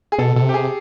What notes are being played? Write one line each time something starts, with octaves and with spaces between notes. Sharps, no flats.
G#4
B2 A4
B2 A4
C3
G4
G#4